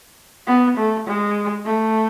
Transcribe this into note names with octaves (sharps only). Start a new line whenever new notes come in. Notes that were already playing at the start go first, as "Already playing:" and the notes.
B3
A3
G#3
A3